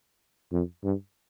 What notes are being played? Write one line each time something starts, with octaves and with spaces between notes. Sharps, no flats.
F2
G2